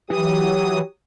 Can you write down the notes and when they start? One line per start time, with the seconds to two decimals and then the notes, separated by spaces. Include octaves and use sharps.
0.10 E3 F#3 G4 D#6